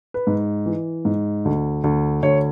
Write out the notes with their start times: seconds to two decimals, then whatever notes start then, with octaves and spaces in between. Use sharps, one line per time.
0.14 B4
0.27 G#2
0.66 E3
1.05 G#2
1.45 D2
1.84 D2
2.23 D2 C#5